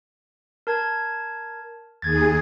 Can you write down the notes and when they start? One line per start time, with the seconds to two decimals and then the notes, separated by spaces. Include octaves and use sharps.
0.67 A#4 A5 G#6
2.02 D#2 G#4 G#6 A6